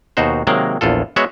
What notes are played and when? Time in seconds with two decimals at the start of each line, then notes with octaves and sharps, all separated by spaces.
0.17 D#2 B2 D#4 F#4 C5
0.47 C3 D#3 F#3 G#3 A#3 A#4
0.81 A#1 E2 F4 A4
1.16 G#3 B3 F#4 C#5 E5